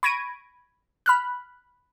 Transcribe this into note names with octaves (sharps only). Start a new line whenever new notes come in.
B5 C#6 G#6 A#6 D7 D#7
B5 F6 F#6